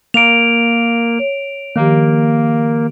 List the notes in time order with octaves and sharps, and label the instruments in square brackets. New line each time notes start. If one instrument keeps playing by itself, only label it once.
[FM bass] A#3 [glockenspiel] D7 F7
[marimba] C#5
[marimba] D#3 F3 G4 [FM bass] A#3